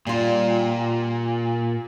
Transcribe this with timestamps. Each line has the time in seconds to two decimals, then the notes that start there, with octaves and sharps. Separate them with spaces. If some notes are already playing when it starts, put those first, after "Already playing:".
0.07 A#2 G3 F4